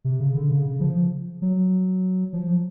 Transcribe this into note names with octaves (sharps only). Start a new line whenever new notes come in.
C3
C#3
D3
C#3
C#3
F3
F#3
F3